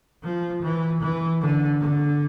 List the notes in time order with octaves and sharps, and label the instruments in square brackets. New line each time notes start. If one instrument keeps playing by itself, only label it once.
[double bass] F3
E3
E3
D3
D3